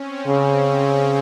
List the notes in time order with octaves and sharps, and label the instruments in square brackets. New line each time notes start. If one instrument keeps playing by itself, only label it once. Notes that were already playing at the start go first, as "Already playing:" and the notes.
Already playing: [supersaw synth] C4 C#4
[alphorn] C#3 [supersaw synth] C#4
[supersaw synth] C#4